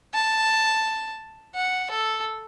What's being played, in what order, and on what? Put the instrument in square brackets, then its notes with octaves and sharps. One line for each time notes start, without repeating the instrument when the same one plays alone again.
[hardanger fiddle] A5
F#5
A4